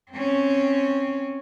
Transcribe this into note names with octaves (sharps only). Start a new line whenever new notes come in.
C4 C#4